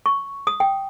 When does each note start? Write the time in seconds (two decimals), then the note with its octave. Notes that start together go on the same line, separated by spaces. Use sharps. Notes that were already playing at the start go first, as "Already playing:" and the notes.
0.06 C#6
0.47 D#6
0.60 G5